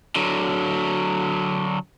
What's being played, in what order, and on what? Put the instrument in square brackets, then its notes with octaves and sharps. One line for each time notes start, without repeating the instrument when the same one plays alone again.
[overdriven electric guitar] D3 F#3